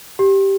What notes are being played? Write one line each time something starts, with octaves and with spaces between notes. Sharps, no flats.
G4